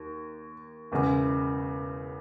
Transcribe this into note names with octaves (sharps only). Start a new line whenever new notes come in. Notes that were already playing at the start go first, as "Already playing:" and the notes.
Already playing: D#2
E1 E2 C#3